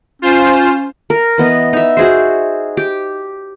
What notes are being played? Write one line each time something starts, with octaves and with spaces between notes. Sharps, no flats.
C#4 F4 C5
A#4
E3 B3 D#5
D#4 E5
F#4 G#4 C5
G4